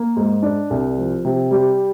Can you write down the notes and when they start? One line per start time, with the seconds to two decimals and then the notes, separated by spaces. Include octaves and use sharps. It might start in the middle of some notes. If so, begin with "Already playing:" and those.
Already playing: A#3
0.17 G#2
0.43 D4
0.70 C2
0.98 F3
1.25 C3
1.51 G3